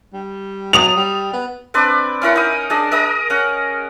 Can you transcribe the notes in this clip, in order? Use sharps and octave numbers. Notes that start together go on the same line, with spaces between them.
G3
F#3 D#6 F7
G3
B3
C4 D4 B4 D5
C#4 E4 A#4 F#5
D#4 D#6
D4 G#4 D#5
A#4 D#5 A#5 D#6
C#4 F#5